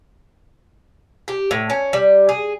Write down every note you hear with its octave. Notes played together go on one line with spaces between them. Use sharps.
G4
A2
C#4
G3
G#4